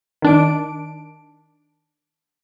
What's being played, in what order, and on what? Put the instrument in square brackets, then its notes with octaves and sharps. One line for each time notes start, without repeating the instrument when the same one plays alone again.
[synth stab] D#3 D4 D7